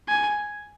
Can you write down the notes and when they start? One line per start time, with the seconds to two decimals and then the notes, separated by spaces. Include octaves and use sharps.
0.08 G#5